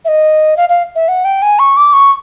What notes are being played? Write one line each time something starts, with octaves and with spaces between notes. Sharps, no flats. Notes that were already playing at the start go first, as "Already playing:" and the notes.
E5
D#5
F5
F5
E5
F#5
G5
G#5
C#6
D6
C#6